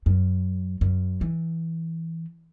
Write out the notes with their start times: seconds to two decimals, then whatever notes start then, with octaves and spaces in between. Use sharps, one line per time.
0.06 F#2
0.81 F#2
1.21 E3